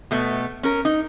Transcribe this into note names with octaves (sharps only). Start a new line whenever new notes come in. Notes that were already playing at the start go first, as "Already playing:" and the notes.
B2 A3 B3
C#4 A#4
D#4